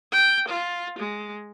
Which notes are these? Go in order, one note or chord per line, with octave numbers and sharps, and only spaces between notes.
G5
F4
G#3